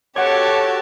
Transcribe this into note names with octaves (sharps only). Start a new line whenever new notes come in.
F#4 G4 A4 C#5 F#5 A5 D6